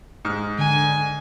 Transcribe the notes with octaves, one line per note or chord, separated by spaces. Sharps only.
G#2 F6
D3 G#5